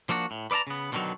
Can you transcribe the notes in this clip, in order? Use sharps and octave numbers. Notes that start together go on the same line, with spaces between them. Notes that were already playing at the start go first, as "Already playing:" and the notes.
F3 A#3 D4 D#4 F#4
A2
B4 D5 E5 A5 A#5
C#3 B3
B2 D3 D#3 F3 F#3